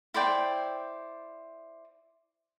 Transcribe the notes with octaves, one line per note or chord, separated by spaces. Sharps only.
E4 C5 D5 G5